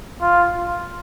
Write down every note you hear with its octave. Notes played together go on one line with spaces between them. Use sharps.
F4